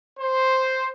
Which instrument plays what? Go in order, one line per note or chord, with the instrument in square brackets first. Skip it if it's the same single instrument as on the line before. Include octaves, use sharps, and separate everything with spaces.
[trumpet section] C5